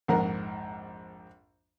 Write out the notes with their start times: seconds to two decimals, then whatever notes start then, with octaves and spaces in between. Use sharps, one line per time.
0.08 A#1 F2 G#2 A#4 F#5